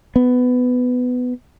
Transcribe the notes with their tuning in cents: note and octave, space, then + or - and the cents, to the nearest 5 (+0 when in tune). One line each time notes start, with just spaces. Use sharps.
B3 +15